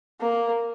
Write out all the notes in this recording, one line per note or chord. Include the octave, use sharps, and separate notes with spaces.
A#3